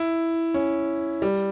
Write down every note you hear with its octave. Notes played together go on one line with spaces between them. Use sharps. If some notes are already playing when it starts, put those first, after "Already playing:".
Already playing: E4
C#4
G3